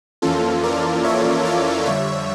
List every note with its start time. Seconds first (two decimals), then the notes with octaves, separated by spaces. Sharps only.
0.22 F2 E3 A#3 C#4 F4 A4
0.63 A#4 D5
1.04 C#5 E5
1.45 D5 F5
1.86 F2 D3 G3 C#5 E5